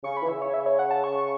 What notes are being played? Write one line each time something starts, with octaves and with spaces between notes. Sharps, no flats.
C#3 C#6
B5
E3
C#3 E5
C#5
E5
C#5
F#5
A5
C#6